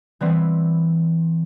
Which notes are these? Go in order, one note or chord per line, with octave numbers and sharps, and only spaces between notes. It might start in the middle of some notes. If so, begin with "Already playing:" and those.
E3 G3 B3 C4